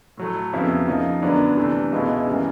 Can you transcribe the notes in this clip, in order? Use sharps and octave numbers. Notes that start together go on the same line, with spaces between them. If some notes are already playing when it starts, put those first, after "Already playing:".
A2 F#3 A3
F2 C#3 F#3 B3 E4
C#3 F3 A#3 D#4
F#2 D3 F#3 B3 D4
C3 E3 A3 D4
C#2 B2 G#3 B3 E4
F#2 C#3 E3 G3 A#3